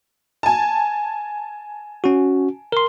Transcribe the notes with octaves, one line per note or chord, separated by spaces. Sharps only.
G#5 A5
C#4 F#4
A#4 C6